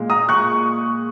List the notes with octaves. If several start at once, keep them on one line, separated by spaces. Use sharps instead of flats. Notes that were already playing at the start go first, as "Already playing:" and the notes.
Already playing: A#2 G#3
A#5 D#6
C#6 F#6